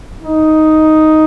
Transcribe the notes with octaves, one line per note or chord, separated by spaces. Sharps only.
D#4